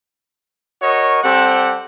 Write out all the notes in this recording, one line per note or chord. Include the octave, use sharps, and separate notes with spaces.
F#4 A#4 C#5 D#5 C#6
G3 C4 G4 A4 F#5